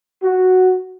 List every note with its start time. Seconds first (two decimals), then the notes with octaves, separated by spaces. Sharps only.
0.23 F#4